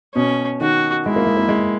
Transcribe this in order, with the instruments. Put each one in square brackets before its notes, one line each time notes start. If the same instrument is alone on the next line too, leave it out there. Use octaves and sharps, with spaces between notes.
[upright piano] B2 [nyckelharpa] C#4
[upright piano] D#3 [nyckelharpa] F#4
[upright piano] G#3 [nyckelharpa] E4
[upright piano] A#3
G#3
A#3
G#3